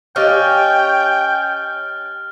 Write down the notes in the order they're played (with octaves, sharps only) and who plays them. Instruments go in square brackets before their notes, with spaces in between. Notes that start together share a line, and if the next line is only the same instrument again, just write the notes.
[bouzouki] C#4 [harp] G4 D#5 F5 [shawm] G5 [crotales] F6 F#6 A6